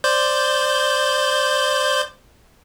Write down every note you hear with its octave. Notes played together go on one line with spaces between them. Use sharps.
C5 D5 G6